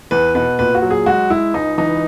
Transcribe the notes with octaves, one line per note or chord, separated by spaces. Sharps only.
E2 B4
B2 B4
A#2 B4
F#4
F#3
G#4
G#3 F#4
G#3 E4
C#2 D#4
E3 D#4